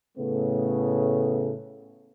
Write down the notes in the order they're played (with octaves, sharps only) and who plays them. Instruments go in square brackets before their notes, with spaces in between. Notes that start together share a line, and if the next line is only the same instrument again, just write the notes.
[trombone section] A2 C#3 A3 B3